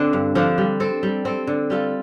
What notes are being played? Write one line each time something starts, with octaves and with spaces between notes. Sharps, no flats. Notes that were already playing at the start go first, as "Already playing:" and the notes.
Already playing: D3 C4 D4
G2
D3 F3 D4
G3
C4 A4
G3
C4 A4
D3
G3 F4 A4